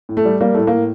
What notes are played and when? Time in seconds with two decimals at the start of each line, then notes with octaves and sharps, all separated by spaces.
0.09 A2
0.17 A3
0.25 G3
0.41 G3 A#3
0.54 A2 A3
0.67 A2 A#3